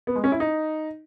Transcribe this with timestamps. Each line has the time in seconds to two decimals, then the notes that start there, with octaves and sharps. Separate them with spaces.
0.07 B3
0.15 G#3
0.24 C#4
0.32 E4
0.40 D#4